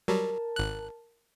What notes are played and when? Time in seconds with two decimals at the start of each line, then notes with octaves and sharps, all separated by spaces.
0.08 F#3 G3 A#4 A5
0.56 G#1 F#6